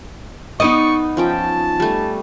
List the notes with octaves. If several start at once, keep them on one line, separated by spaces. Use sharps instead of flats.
B3 D#4 D5 D#5 C#6
F3 C#4 G5 A5
G3 A3